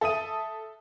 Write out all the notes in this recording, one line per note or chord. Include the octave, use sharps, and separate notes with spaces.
A4 E5 D#6 D#7